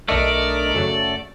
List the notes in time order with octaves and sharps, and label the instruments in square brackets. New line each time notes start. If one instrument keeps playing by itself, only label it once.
[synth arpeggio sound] B1 D4 D#5 [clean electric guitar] A3 [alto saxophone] A#4 [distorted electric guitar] D5
[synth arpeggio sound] F#2 C#3 F#3 [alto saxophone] A4